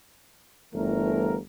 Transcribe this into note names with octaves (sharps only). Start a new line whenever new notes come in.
G1 E3 A3 A#4